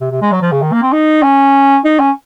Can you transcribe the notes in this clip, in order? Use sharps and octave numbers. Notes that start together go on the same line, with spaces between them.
C3
C3
G#3
F#3
F3
C#3
D#3
A#3
C4
D#4
C#4
D#4
C#4